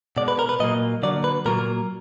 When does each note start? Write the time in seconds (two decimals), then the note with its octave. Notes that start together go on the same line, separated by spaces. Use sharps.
0.17 B2 G#3 D5
0.28 B4
0.39 A#4
0.49 B4
0.60 A#2 F#3 A#3 D#5
1.03 D3 F#3 A#3 D5
1.24 B4
1.46 A#2 F#3 A#3 A#4